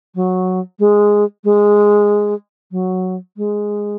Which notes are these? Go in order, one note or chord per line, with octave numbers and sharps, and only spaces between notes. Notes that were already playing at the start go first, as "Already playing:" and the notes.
F#3
G#3
G#3
F#3
G#3